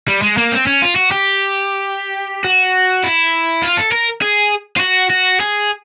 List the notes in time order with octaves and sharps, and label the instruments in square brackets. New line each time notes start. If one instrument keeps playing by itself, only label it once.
[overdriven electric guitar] G3
G#3
A#3
C4
C#4
F4
F#4
G4
F#4
E4
F4
A4
A#4
G#4
F4
F#4
F#4
G#4